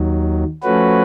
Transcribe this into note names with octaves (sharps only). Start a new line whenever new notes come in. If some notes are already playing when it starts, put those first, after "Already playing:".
Already playing: D#2 D#3 F#3
F3 A3 C#4 F#4 B4